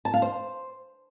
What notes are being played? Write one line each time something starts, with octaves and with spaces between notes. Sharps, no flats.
A5
F5
C5